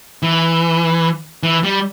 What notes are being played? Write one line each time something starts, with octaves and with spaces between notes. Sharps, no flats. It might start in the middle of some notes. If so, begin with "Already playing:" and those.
E3
E3
G3